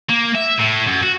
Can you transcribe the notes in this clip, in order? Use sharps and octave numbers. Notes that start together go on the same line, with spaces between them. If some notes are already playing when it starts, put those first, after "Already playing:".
A#3
E5
A2
F#2
F#4